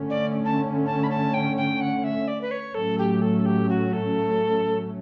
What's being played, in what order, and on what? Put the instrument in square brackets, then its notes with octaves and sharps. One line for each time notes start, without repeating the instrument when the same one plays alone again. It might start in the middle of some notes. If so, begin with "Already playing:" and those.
Already playing: [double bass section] D3 A3 C#4
[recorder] D5
A5
A5
B5
A5
G5
G5
F#5
E5
D5
B4
C#5
[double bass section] A2 F#3 A3 C#4 [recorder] A4
[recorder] G4
A4
G4
F#4
A4